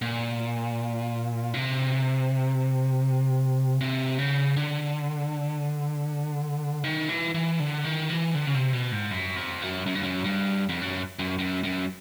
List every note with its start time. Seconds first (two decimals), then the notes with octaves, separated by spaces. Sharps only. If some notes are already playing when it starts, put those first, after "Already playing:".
0.02 A#2
1.54 C3
3.81 C3
4.19 C#3
4.57 D3
6.84 D#3
7.09 E3
7.35 E3
7.60 D3
7.84 D#3
8.10 E3
8.35 D3
8.47 C#3
8.54 C3
8.73 B2
8.92 G#2
9.11 F#2
9.36 F2
9.62 F#2
9.86 F#2
9.95 G2
10.03 F#2
10.24 G2
10.69 F2
10.82 F#2
11.19 F#2
11.39 F#2
11.64 F#2